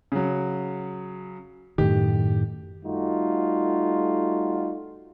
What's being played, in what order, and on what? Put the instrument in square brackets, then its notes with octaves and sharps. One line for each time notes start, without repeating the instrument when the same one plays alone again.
[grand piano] C#3 F#3
[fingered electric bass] F#2 A2 D#3 [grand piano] G4
[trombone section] G3 A3 D#4 F4 F#4